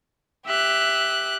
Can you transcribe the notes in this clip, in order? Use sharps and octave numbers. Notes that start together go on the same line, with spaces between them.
G4 E5 F#6